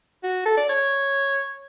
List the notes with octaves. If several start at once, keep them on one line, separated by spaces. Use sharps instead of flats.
F#4
A4
D5
C#5